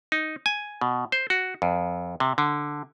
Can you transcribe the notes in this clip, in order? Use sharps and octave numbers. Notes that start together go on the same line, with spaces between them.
D#4
G#5
B2
C5
F#4
F2
C3
D3